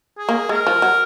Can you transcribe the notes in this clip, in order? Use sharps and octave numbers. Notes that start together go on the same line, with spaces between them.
G#4
A#3
G#3 A#4
F3
F#3